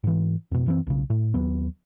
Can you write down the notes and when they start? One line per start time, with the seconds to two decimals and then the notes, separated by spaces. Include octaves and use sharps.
0.04 G#2 E3
0.52 F2 B2
0.66 F#2 E3 C4
0.87 B1 C#3
1.10 A2
1.34 D#2 F#3 B3